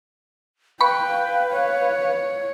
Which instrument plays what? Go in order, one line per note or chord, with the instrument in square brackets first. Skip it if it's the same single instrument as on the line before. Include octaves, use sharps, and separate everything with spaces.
[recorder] B4 [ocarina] F5 [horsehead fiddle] G5 [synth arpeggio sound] B5 C#6
[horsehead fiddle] C#5